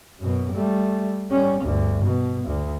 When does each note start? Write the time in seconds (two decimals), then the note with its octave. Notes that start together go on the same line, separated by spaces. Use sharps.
0.19 F#2 B2
0.52 G3 A3
1.30 G3 C#4
1.62 G1 D2
2.04 B2
2.47 D2